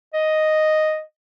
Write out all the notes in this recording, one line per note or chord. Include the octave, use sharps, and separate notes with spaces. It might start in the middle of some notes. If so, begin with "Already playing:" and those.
D#5